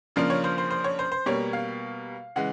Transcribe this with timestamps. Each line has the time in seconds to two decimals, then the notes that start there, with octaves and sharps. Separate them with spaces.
0.16 C#3 F3 A#3 D4 F4
0.30 C#5
0.44 C5
0.58 C5
0.71 C5
0.84 C#5
0.99 C5
1.12 C5
1.26 B2 G3 A#3 C#5
1.53 F5
2.36 C#3 E3 G#3 F#5